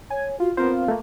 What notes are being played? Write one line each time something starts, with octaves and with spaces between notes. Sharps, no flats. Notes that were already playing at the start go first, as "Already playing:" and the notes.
C#5 G#5
F4 F#4
B3 C4 F4 A#4 C5
A3 A#3